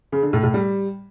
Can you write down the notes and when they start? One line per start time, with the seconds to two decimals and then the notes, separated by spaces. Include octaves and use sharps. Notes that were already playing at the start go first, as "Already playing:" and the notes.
0.12 C#3
0.23 D3
0.33 A2
0.44 A2
0.54 G3